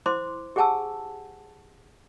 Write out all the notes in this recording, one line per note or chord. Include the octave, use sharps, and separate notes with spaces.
E4 C5 C6 D6
G4 G#4 F#5 G#5 A5 E6